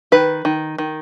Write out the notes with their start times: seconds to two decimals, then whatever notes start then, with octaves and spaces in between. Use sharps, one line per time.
0.12 D#3 B4
0.45 D#3
0.78 D#3